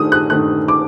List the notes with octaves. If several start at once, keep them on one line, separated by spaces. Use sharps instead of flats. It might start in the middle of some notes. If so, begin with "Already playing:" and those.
Already playing: G2 D#3 A3 D#6
F#6
G2 D#3 A3 F#6
D6